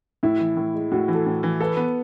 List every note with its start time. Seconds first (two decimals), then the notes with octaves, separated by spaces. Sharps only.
0.23 A2 E4
0.40 E3
0.57 A2
0.74 G#3
0.92 A2 F#4
1.08 E3
1.14 A4
1.26 A2
1.43 E3
1.61 A4 B4
1.77 B3